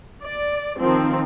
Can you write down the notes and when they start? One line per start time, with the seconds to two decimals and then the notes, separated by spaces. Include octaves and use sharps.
0.24 D5
0.79 D#3 F3 C4